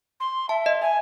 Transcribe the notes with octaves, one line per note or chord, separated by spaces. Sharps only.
C6
E5 A5
D#5
E5 G#5